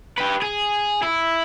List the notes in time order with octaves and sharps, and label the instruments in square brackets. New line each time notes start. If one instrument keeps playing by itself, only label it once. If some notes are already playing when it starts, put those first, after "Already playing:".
[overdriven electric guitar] G4 B4
G#4
E4